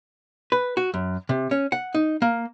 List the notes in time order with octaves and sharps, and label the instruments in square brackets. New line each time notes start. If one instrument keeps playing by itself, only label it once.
[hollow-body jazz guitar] B4
F#4
F#2
C3
C#4
F#5
D#4
A#3